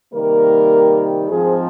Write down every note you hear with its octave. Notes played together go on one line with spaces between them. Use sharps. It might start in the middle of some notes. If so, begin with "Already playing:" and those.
C3 D#3 G3 A#3 A#4
G#2 F3 C4 G#4